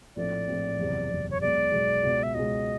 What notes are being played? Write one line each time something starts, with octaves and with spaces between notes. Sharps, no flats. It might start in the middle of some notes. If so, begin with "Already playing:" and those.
A#1 A2 F3 A3 C4 D5
A#1 A2 F3 A3 C4
F#1 E2 C3
F#1 E2 C3
C#5
B1 B2 G#3 D5
B1 B2 G#3
C#2 B2 G#3
E5
C#2 B2 G#3 D#5